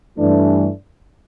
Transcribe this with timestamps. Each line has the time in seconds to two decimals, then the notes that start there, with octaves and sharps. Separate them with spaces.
0.18 G2 E3 A3 D4